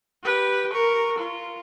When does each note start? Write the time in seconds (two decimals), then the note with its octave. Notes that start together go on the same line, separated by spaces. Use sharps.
0.24 G4 B4
0.73 A#4 C#6
1.19 F4